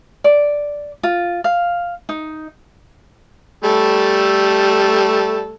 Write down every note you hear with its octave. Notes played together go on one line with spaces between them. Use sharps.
D5
F4
F5
D#4
G3 A3 A4